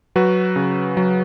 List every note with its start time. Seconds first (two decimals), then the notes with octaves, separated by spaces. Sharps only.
0.16 F#3 F#4 B4
0.56 C#3
0.97 F#3